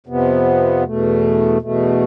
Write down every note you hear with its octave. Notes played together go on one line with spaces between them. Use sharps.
F2 C3 F3 B3
E2 B2 A3
E2 B2 A3